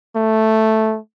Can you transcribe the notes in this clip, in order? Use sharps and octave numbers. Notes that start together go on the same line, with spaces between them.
A3